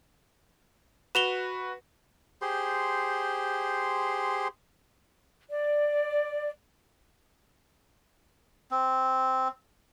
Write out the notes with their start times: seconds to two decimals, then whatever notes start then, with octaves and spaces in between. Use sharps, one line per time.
1.15 F#4 B4 E7 F7 G7
2.42 G4 G#4 C5 C6
5.50 D5
8.71 C4